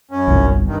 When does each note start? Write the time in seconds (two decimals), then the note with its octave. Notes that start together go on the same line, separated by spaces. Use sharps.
0.11 F#2 C#4
0.27 G1 C2
0.66 G2 D#3